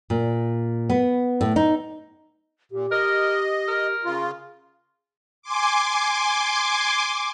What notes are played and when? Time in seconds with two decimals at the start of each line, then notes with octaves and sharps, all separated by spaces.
0.10 A#2
0.90 B3
1.41 A2
1.56 D#4
2.72 A#2 G4
2.92 A#4 D#5
3.68 A#4
4.05 C#3 F4
5.42 G#5 C6 D6